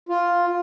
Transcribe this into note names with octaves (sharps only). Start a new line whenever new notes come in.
F4